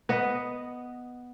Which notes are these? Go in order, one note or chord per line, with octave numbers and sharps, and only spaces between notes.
B3 D#5